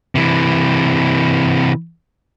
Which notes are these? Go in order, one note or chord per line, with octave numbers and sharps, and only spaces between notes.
C3 E3